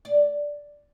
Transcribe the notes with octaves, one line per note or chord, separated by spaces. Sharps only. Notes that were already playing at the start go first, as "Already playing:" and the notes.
D5